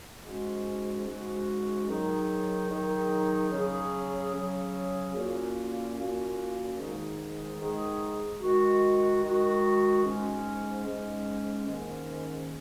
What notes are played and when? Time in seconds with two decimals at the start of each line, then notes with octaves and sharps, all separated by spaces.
0.24 G#2 G#3 C#4 F#4
1.06 G#2 G#3 C#4 F#4
1.88 D#3 F#3 D#4 G#4
2.70 D#3 F#3 D#4 G#4
3.50 C#3 F#3 C#4 G#4
4.32 C#3 F#3 C#4 G#4
5.14 A#2 A#3 C#4 F#4
5.96 A#2 A#3 C#4 F#4
6.77 G#2 D#3 G#3 D#4 G#4
7.59 G#2 D#3 G#3 D#4 G#4
8.41 D#3 G#3 F#4
9.22 D#3 G#3 F#4
10.03 G#2 G#3 C#4
10.85 G#2 G#3 C#4
11.67 G#2 D#3 A#3 C#4